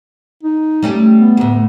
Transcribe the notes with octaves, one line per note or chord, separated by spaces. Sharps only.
D#4
G3 A3 C#4
B3
D2 A2